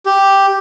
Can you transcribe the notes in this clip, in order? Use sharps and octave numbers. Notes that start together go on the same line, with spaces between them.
G4